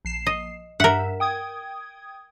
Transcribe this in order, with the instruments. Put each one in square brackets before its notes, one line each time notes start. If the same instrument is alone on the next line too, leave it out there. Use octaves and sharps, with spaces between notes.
[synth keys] A#1 C7 E7
[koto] D#5
[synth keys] G2 E5 [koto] A#4 F#5
[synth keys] G5 D#6 G#6